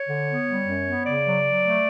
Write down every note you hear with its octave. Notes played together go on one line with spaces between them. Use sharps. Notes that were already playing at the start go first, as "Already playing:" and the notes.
Already playing: C#5
D3
B3
G3
F#2
B3
C#3 D5
F#3
F#3
A3